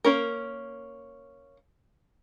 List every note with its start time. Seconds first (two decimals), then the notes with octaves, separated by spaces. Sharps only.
0.05 A#3 C#4 A#4